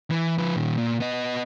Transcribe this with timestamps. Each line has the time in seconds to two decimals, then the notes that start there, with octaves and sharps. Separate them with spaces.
0.10 E3
0.38 F3 B4
0.57 A#2 D#3
0.78 A#2
1.00 B3 D#5